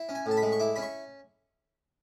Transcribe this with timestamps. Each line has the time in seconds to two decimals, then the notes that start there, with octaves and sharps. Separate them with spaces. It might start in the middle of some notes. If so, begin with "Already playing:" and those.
Already playing: E4
0.09 C#4
0.15 G#5
0.26 A2
0.31 A5
0.37 B5
0.42 G#3
0.52 C#6
0.60 E4 D6
0.76 C#4 B5
0.82 C#6